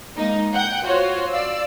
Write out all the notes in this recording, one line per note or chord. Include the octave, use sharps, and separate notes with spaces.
G#3 A#3 D#4
F#5 G5 G6
F4 F#4 C5 C#5
D5 F5 E6